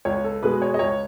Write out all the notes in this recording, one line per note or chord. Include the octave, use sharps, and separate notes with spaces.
C#2 C#5
A4
B2 G#3 B4
C#5
D#5
C#2 C#5